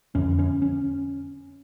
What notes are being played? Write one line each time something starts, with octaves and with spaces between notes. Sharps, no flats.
F2 D3 C#4
C#4
C#4